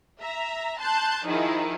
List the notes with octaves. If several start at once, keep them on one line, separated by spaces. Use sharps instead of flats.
E5 A#5
A5 C6 F#6 G6
D#3 F3 E4 G#4